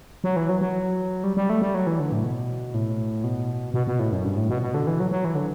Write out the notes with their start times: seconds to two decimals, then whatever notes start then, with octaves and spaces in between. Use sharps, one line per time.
0.24 F#3
0.36 E3
0.49 F#3
0.61 F#3
1.24 G3
1.37 G3
1.50 A3
1.62 G3
1.74 F#3
1.87 E3
1.99 D3
2.12 A2
2.24 B2
2.74 A2
3.24 B2
3.74 B2
3.87 B2
3.99 A2
4.12 F#2
4.24 G2
4.37 A2
4.49 B2
4.62 B2
4.74 D3
4.87 E3
5.00 F#3
5.11 F#3
5.25 E3
5.35 D3